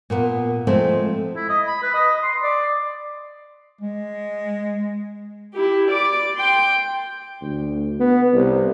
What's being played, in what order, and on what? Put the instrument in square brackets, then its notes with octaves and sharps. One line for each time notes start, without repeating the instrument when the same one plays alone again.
[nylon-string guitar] A#2 A#3 B3
F3 G#3 A3 C4 A4
[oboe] E4
D#5
B5
B4
D#5
C6
D5
[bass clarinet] G#3
[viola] E4 G4
D5 D6
G5 C6
[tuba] D2
B3
C2